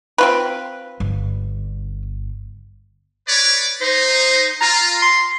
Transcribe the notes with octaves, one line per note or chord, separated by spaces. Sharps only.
C4 F4 B4
G1
B4 C#5 D5
D#4 C5
F4 A#5
C6